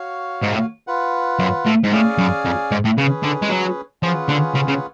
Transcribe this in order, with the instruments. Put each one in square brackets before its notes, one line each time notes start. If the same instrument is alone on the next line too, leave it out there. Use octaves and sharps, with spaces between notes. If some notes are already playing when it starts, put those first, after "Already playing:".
Already playing: [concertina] F#4 C#5 F5
[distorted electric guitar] G#2
A2
[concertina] F4 B4 F#5
[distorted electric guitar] F#2
A2
G#2
[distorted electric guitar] A2 [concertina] C#4 G#4 D5 F5 G#5
[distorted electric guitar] F#2
F2
G#2
A2
[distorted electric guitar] C#3 [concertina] C#4 G#4 B4
[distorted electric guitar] D3
G#3
F#3
[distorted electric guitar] F3 [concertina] C#4 F4 G#4 B4 F#5
[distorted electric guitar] D3
C#3
C#3